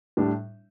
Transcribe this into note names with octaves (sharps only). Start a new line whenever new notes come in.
A2 G3 D4